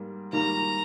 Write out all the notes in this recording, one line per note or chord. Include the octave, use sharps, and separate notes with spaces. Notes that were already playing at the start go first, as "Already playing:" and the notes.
Already playing: G#2 G3 A#3
G#2 D#3 G3 A#3 A#5